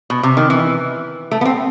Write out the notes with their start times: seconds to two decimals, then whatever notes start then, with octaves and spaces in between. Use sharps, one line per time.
0.10 B2
0.23 C3
0.37 D#3
0.50 E3
1.31 A3
1.41 B3
1.45 C4